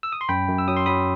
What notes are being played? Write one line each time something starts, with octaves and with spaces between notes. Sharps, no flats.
E6
D#6
C6
F#2 G5 B5
F#2
E6
F#3 D#6
C6
F#3 B5 D#6